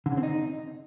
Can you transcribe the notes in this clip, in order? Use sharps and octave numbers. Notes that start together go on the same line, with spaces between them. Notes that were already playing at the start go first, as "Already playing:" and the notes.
D3
C#3
C4
D#4